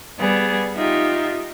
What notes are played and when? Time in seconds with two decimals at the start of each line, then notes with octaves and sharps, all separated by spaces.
0.18 G3 B3 G#4
0.76 D#4 F4 G4 E5